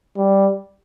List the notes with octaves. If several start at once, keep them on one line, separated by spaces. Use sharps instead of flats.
G3